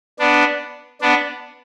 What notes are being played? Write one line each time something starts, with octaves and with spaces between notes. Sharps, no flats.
B3 D4
B3 D4